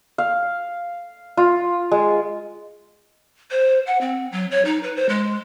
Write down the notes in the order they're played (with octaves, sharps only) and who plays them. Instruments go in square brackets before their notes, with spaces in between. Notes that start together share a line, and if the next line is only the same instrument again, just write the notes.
[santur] F5
F4
G#3
[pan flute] C5
F#5
C4
F#3
C#5
D#4
B4
C5
G#3